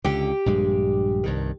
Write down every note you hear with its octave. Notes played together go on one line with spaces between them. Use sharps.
C#2 D3 G4
A#1 G2 G#3
C2 G2 D#3